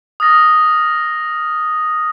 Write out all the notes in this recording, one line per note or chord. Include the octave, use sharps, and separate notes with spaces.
D#6 F6 A6 A#6